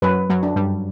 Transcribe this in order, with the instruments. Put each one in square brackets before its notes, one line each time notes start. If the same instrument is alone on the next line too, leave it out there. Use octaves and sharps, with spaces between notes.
[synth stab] F#2 F#3 [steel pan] B4
[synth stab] F#2 F#3
[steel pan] D4
[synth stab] G2 G3